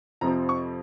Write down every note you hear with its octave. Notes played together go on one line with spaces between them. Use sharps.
F2 C3 F3 C4 A#5
C#6